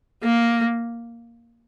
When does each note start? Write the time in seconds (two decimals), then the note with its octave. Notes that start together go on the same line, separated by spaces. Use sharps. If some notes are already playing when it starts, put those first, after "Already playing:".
0.23 A#3